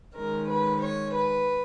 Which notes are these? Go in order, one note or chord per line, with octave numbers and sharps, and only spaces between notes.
D#3 G#3 C#4 A#4
B4
C#5
B4